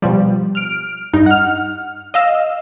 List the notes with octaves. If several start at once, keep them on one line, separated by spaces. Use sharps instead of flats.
B2 F3 G3
F6 D7
G2 D#4
F#5 F6
D#5 F5 E6